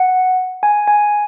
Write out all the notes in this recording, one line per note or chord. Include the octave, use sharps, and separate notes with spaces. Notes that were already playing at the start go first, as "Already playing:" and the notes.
Already playing: F#5
G#5
G#5